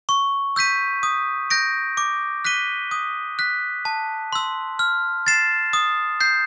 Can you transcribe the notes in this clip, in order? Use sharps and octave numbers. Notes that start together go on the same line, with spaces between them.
C#6
E6 G6 B6 D#7
D#6
G6 A#6 D7
D6
F#6 B6 D#7 G7
D#6
F#6 B6
A5
C6 E6
F6
A6 C7 E7
D#6
G6 C7